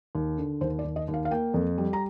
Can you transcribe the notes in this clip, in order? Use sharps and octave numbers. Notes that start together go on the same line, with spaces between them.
D#2
D3
D#2 C5
D5
D#2
D#5
D#2
F5
F5
A#3 G5
F2
G3
A#5